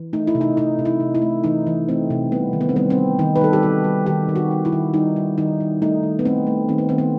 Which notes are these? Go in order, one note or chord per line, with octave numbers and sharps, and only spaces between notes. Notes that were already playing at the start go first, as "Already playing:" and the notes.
Already playing: E3
A3 D#4
E4
C3
D#4
C3 D#4
C3
E4
C3
E4
A3
E3 D#4
E3
A3 C4
C3
G3 B3
D#3
B3
C4
G3 B3
C4
G3
D#3 D#4
B4
G3 A4
G4
G3 F#4
G3
D#3 G4
D#3
F#4
G3
E4
D#3
G3 D#4
G3
D#3 D#4
G3
A3 D#4
D#3
B3
A3 C4
A3
D#3 C4
B3
D#3 C4
B3